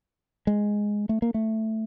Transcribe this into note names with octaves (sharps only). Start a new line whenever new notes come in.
G#3
A3
A#3
A3